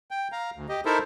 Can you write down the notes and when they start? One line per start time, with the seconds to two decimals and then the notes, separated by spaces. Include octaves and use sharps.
0.11 G5
0.32 F5 A#5
0.56 D2
0.69 G4 D#5
0.85 D#4 E4 A4 A#4 C5 E5